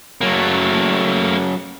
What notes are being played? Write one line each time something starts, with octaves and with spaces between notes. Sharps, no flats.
C#3 F#3 A3 A#3